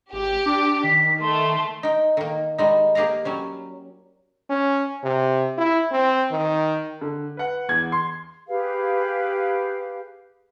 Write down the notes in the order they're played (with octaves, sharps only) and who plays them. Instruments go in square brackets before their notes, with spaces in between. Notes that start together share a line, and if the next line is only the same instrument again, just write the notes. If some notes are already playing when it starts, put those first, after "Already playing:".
[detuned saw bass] G#1 [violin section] G4
[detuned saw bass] D4 [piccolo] D6
[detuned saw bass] D#3 [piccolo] B6
[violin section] A3 [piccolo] C6
[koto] D#4 G5
D#3 A#3
G3 G#3 D#4
A#3 G4 G#4 F5 A#5
F#3 G3 C#4
[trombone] C#4
C3
E4
C4
D#3
[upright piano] D3
B4 F#5
E2 G#6
C6
[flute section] G4 G#4 B4 F5